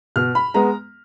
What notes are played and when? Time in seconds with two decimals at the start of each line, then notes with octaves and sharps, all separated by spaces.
0.16 B2 F6
0.35 B5
0.54 G#3 B3 A#5